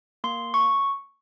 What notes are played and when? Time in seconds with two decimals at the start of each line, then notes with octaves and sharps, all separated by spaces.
0.24 A#3 C6
0.54 C#6